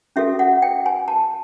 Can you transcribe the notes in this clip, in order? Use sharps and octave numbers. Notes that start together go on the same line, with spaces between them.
C#4 F#4 A4 E5
F#5
G5
G#5
A5